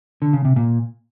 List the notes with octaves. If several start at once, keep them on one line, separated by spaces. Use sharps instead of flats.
D3
C#3
C3
A#2